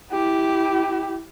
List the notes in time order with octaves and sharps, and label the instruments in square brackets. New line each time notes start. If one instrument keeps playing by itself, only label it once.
[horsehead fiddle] E4 G4